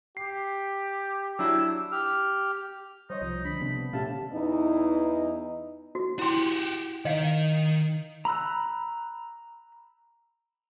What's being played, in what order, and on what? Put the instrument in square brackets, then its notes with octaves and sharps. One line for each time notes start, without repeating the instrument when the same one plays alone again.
[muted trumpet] G4 [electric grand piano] C7
[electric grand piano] F#3 D4 E4 [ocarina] E6
[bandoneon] G4 F6
[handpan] G3 [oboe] D#4 [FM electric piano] C5 C#5 D#5
[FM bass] C2 [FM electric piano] F3
[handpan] D3 D4 [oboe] B5
[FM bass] C3 [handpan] B3
[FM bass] A#2 [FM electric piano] A3 E5 F5 [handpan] C#4 G4 [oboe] A5
[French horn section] E2 E3 D#4
[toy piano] F#4
[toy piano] E4 C6 [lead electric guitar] F#4 G4
[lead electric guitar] D#3 [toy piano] D#5 F5
[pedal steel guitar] A#5 B5 E6 F#6